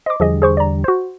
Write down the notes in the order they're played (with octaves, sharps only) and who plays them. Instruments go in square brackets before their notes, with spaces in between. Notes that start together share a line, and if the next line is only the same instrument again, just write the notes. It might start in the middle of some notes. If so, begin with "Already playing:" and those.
[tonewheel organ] C5 [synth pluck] D#5 D6
[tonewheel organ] E2 D3 G3 [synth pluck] F3 G#4 D#5
[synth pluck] G#4 C5 C#6
D5 A#5
F#4 C5